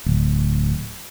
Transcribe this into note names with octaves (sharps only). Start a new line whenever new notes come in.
D1